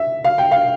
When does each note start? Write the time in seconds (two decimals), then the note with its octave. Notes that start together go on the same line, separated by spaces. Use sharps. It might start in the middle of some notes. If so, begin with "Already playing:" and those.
Already playing: E5
0.24 F5
0.38 G5
0.51 F5